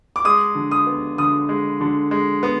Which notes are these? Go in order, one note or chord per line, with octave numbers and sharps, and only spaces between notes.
D6
G#3 D#6
D3
D#6
B3
D3 D#6
G#3
D3
G#3
B3